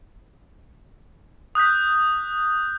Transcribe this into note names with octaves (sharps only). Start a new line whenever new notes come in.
D#6 F#6 G6 B6